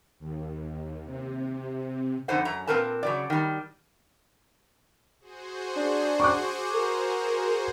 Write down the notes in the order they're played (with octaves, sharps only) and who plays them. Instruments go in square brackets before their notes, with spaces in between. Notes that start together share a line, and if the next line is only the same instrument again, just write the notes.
[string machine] D#2
C3
[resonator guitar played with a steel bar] F2 D3 D#4 C5 F#5
F#2 A#5
A#2 F3 C4 A#4 B4 A5
C#3 F#3 D5
D#3 G3
[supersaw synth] F#4 G#4 C5
[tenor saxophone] D4
[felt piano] C#6 D6 F#6
[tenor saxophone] A#4